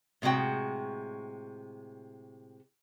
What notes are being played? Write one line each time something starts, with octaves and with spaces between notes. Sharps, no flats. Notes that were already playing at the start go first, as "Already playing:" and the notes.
A2 C3 G#3 F#4 G5